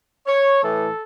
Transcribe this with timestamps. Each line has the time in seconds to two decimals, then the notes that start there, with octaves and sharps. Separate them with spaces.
0.26 C#5
0.62 A2 E3 A4